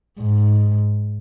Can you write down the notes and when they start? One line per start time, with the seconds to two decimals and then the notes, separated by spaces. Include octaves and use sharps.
0.20 G#2